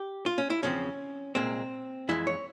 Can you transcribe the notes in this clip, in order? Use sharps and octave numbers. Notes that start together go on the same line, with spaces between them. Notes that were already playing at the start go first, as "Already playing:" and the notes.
Already playing: G4
F4
C#4
E4
E2 C#3 F3 C4 C#4
C2 A#2 G#3 C4
F2 E3 G#3 E4
C#5